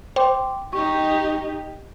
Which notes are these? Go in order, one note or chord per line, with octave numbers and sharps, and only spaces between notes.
C5 G5 C6 D6
D#4 G4 C#6